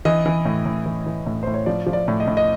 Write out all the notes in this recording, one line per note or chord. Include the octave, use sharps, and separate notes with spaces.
E3 D#5
E3
A2
A2
E3
E3
A2
A2 C5
C#5
F3 D5
F3
D5
A2
D#5
A2
D#5